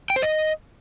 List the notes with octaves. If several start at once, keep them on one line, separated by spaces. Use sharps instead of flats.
G5
C5
D#5